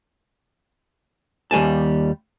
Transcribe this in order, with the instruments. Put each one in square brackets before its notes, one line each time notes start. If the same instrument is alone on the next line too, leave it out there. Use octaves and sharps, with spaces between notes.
[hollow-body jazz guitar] D#2 G3 G#5 A5